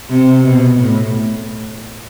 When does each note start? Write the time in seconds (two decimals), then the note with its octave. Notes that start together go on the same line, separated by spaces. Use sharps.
0.10 C3
0.44 B2
0.79 A2